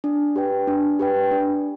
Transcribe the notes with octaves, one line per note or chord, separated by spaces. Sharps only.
D4
G4 B4 G5
D4
G4 B4 G5
D4